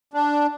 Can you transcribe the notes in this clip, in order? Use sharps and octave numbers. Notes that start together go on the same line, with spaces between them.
D4